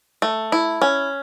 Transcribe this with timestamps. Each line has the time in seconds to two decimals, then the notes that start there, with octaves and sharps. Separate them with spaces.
0.22 A3
0.52 E4
0.82 C#4